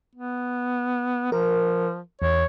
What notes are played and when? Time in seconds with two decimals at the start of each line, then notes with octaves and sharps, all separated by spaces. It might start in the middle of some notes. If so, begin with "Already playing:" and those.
0.15 B3
1.32 F3 A#4
2.22 E2 C#5